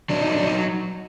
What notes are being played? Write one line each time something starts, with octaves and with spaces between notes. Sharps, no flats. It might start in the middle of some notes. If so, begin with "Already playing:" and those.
F#3 D4
F#3 D#4
D4
F#3
D#4